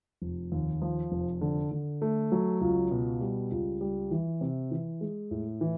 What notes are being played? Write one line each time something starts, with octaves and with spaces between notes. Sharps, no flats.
F1
D#2
F3
F1
D3
D3
A3
F#3
C#2
B2
G3
C#2
G3
E3
C3
E3
G#3
A2
E3